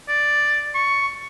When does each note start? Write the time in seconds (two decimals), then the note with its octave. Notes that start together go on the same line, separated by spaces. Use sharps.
0.08 D5
0.74 C#6